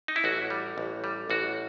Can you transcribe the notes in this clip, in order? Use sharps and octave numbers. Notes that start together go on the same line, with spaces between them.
D#4
E4
A1 F#4
G3
A1
G3
A1 F#4